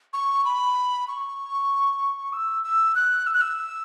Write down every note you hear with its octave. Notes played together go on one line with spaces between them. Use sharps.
C#6
B5
C#6
E6
E6
F#6
E6
F#6
E6